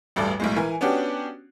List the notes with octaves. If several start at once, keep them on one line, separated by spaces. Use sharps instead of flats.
A1 D2 G2 A4 D5
B1 A2 G#3
E3 A#4 G#5
B3 C#4 D4 F#4 G4